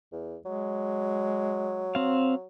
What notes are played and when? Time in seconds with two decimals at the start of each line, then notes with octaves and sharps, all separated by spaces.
0.12 E2
0.45 F#3 G#3
1.95 C4 F5